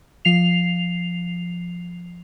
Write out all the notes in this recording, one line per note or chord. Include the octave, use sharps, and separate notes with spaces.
F3 C7 F7